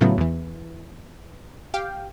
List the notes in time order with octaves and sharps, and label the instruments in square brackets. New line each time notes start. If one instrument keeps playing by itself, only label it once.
[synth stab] A2 C#3 F3 F#3 A3 B3
E2 E3
G4 F5 G5